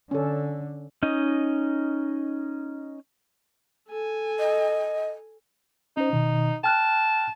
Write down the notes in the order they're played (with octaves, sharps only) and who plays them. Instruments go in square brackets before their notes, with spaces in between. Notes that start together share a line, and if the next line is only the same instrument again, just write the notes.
[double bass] D3 [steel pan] C#4 A4
[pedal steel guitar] C#4 D#4 D#5
[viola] A4 G#5
[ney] D#5
[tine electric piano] C#4 C5 [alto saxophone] D#4
[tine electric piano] B2 D#3
[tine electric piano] G5 F6 F#6 [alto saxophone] A5